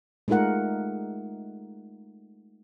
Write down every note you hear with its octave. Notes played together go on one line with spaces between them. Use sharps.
G#3 A3 D#4 F4 A#4 F#5